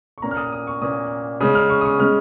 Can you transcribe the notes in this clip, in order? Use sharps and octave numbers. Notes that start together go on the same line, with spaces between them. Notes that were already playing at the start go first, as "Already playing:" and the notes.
C#6
A#2 A#3 C#4 A#5
F6
D#6
D#6
C#6
A#2 A#3 C#4 D#6
C#3 G#3 C#4 D#6
F6
C#6
D#6
C#6
C#3 G#3 C#4 F6